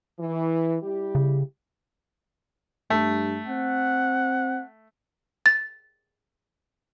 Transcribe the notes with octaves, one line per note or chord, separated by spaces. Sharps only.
E3
G3 E4 G4
C#3
G2 A3
C4 F#5
A6